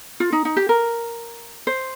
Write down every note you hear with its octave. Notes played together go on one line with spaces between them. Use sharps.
F4
D#4
D#4
G4
A#4
C5